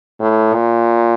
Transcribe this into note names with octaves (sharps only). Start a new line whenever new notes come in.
A2
A#2